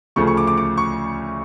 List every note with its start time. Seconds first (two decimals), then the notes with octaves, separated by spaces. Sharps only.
0.16 D2 C#3 F3 A3 C#6
0.27 C#6
0.37 D6
0.47 D6
0.57 D6
0.77 C#6